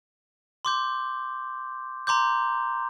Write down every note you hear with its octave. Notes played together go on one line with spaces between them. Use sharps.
C6 D6 G6
A#5 C6 D6 G6